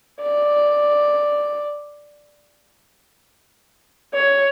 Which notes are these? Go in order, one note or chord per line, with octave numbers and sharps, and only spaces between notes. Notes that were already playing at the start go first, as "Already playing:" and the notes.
D5
C#5